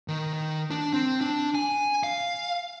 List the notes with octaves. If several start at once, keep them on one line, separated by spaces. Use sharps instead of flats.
D#3
D#3
D4
C4
D4
G#5
F5